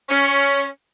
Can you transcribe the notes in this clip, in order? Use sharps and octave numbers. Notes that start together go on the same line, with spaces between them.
C#4